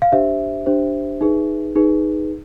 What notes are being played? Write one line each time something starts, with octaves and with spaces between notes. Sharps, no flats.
F5
D4 G4 C5 E5
D4 G4 C5
D#4 G#4 B4
D#4 G#4 B4